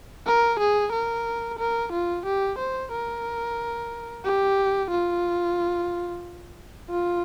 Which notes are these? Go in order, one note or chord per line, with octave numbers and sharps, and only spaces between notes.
A#4
G#4
A#4
A#4
F4
G4
C5
A#4
G4
F4
F4